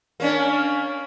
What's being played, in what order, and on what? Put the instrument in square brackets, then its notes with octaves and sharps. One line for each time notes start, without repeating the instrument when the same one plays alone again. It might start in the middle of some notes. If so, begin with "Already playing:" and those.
[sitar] A#3 C#4 D4